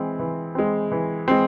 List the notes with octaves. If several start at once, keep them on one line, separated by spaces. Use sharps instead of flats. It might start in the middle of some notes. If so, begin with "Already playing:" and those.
Already playing: E3 G#3 C4
E3
G#3 C4
E3
G#3 C4